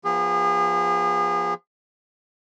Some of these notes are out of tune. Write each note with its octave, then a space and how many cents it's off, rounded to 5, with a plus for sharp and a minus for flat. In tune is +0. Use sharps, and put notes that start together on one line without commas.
F3 +0 B3 -30 G#4 -35